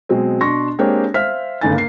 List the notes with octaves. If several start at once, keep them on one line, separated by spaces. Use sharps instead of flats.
B2 F#3 G#3 C4
B2 D4 C6 C#6 A#6
G#3 A#3 C4 D4 G4 C#5
C5 E5 F5 F6 B6
G1 C#3 A3 D#4 G#5 A6
A#3 C7